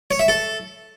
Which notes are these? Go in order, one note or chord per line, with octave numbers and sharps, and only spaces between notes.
C#5
E5
A4